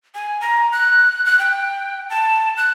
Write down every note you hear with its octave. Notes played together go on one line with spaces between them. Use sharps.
G#5
A#5
F#6
F#6
G5
A5
F#6